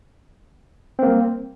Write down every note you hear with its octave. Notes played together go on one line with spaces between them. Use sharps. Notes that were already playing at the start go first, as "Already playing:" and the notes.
G3 A#3 C4